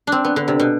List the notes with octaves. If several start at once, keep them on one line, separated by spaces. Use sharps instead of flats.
C4 D4
B3
D3
C3
B2